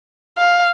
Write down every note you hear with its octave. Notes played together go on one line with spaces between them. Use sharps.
F5